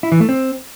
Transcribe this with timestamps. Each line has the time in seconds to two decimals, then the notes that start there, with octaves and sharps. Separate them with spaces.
0.03 E4
0.12 E3
0.20 A3
0.29 C4